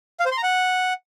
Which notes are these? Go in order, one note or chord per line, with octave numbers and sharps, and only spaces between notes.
F5
C5
C6
A#5
F#5